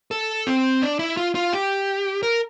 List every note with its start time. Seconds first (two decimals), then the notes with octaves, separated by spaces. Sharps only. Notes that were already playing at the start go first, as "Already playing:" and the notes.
0.11 A4
0.47 C4
0.82 D4
0.99 E4
1.17 F4
1.35 F4
1.53 G4
2.23 A#4